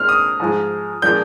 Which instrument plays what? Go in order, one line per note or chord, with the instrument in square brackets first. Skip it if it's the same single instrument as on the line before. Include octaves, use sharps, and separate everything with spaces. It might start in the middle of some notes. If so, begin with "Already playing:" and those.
Already playing: [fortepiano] A#2 G#3 C4 D#4 [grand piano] F6
[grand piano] D#6
[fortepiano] G#2 F3 G#3
[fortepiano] A#2 F3 G#3 D4 [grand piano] G6